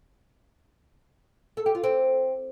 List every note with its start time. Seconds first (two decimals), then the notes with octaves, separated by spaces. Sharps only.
1.57 A4
1.66 G4
1.75 F4
1.84 C4